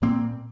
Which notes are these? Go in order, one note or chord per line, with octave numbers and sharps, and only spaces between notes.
A#2 A#3 C4